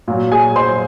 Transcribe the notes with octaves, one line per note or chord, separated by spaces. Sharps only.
A#2 F#3
G#4 G#5
C5 C6